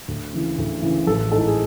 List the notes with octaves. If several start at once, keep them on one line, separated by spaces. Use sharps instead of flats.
D2
C#3 E3
D2
C#3 E3
A1 A4
G#2 E3 A4
G#4